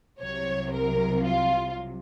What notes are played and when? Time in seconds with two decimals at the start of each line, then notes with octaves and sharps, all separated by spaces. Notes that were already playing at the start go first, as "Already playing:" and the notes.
0.20 C2 C3 F#3 C#5
0.73 A#4
1.26 F4